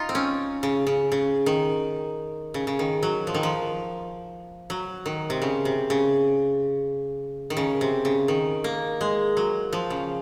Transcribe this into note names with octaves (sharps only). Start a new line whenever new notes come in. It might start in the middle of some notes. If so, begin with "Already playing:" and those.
Already playing: D#4 F4
C4
C#4
C#3
C#3
C#3
D#3
C#3
C#3
D#3
F#3
F3
D#3
F3
F#3
D#3
C3
C#3
C3
C#3
D#3
C#3
C3
C#3
D#3
A#3
G#3
F#3
F3
C#3